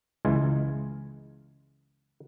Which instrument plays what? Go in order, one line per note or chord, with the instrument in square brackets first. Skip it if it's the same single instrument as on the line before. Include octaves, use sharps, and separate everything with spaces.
[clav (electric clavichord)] C#2 E3 G#3 F4 G#5